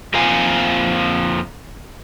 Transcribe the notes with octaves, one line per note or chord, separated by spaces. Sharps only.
F2 F3 A#3 A#4 F5 G#5